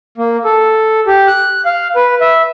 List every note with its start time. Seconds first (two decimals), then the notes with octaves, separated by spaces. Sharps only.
0.18 A#3
0.45 A4
1.07 G4
1.28 F#6
1.65 F5
1.96 B4
2.21 E5